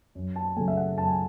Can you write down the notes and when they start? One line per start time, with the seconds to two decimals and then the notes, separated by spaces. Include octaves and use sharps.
0.15 F#2
0.36 A5
0.56 C#3 F#3 A3 G#5
0.68 E5
0.77 F#5
0.98 F#2 A5
1.08 G#5